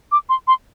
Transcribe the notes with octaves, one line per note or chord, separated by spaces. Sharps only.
D6
C6
C6